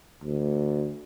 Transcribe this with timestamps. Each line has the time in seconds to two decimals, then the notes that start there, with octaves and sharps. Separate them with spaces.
0.24 D2